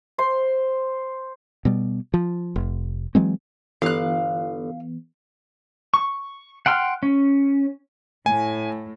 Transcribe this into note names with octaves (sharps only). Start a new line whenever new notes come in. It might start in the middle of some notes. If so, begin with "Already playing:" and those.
C5 C6
B2 G3
F3
F1
E3 F#3 G#3 C4
G1 E3 B3 F5 F#6
C#6
F#5 G5 C6 F6
C#4
A2 G#5